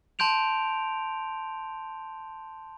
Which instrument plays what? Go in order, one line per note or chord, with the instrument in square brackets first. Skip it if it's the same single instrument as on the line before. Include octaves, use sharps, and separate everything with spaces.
[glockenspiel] A5 C6 G6 D7 F7